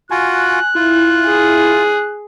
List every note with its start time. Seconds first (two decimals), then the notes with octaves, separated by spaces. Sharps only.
0.11 F4 F#4 G#5 F#6
0.75 E4 F4
1.26 G#4